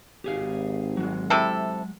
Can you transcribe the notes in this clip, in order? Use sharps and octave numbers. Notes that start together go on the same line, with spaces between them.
G#1 G4 G#4 F5
F#3 G#3
C3 E4 A4